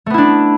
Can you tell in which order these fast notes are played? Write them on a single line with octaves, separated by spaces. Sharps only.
A3 B3 E4 D4